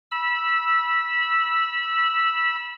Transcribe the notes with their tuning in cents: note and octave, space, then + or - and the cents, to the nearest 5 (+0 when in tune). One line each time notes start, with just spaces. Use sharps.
B5 -25 E6 +0